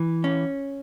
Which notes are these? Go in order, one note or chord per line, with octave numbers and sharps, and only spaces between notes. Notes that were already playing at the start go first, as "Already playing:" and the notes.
Already playing: E3
C#4